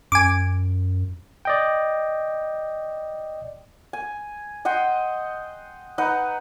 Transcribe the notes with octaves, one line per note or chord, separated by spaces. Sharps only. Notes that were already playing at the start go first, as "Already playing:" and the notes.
F#2 G#5 D6
D5 D#5 G5
G#5
D#5 F#5 G5 C6
D#4 B4 F#5 A#5